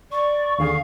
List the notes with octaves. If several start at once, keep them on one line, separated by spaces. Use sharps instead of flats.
D5 C#6
D#2 D3 G#4 F5